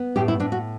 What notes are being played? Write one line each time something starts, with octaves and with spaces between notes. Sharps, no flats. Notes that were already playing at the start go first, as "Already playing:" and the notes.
Already playing: B3
A2 G4
E4
A2 D4
F#4